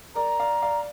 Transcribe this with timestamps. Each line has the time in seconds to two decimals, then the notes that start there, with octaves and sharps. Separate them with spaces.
0.15 A#4 D5 A#5
0.39 D5 F5
0.62 D5 F5